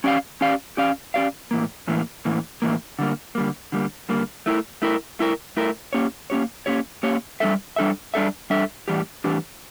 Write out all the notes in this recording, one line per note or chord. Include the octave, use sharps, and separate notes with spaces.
C#4 G4 D5 F5
C#4 G4 D5 F5
C#4 G4 D5 F5
C#4 G4 D5 F5
A2 E3 A#3
A2 E3 A#3
A2 E3 A#3
A2 E3 A#3
D3 G3 A#3
D3 G3 A#3
D3 G3 A#3
D3 G3 A#3
A3 E4 A#4
A3 E4 A#4
A3 E4 A#4
A3 E4 A#4
A#3 C#4 G4 C#5
A#3 C#4 G4 C#5
A#3 C#4 G4 C#5
A#3 C#4 G4 C#5
G3 D4 A4 E5
G3 D4 A4 E5
G3 D4 A4 E5
G3 D4 A4 E5
A2 E3 G3 D4 G4
A2 E3 G3 D4 G4